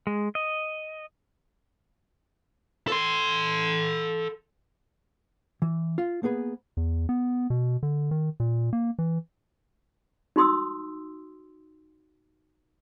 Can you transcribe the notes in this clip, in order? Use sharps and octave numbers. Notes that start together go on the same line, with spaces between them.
G#3
D#5
A4 C6
E3
F4
A#3 B3 G#4 B4
E2
B3
B2
D3
D#3
A#2
A#3
E3
D#4 F#4 C6 D#6 E6